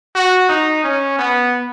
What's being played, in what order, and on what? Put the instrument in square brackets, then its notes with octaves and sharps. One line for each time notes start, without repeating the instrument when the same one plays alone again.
[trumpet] F#4
D#4
C#4
B3